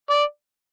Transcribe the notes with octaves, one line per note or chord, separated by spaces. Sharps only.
D5